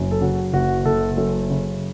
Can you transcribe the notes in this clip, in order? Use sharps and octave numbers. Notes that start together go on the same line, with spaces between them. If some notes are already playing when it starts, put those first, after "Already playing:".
Already playing: F#1 F#2
A4
C#3 F#4
F#1 F#4
F#1 A4
F#2 A4
C#3